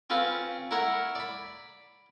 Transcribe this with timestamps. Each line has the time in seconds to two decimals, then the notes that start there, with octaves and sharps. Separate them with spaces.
0.10 C4 C#4 F4 B4
0.71 E4 A#4 C#5 F#5
1.15 D5 B5